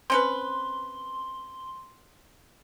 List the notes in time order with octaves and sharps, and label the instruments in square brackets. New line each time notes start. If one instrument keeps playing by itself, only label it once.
[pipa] C4 C#4 B4 [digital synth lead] C6